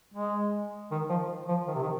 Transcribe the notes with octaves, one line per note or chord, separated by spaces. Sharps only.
G#3
D#3
F3
F3
D#3
C3
D#3